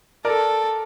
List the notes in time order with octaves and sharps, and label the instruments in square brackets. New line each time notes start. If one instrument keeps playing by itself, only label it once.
[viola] A4 [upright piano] A#4 D5